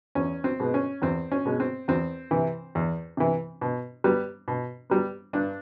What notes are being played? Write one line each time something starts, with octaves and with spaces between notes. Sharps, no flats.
E2 C#4
C4
B2 G#3 B3
C#4
E2 C4
C#4
B2 G#3 B3
C4
E2 C4
C3 E3
E2
C3 E3
B2
G3 B3
B2
G3 B3
G2 D4